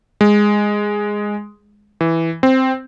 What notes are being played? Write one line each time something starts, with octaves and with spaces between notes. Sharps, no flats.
G#3
E3
C4